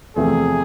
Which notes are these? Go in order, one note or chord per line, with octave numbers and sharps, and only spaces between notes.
E2 C3 F3 A3 C4 G#4